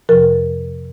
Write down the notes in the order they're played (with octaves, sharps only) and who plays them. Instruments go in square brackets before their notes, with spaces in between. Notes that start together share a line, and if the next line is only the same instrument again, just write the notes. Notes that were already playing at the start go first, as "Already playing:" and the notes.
[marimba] F2 C3 F3 A#4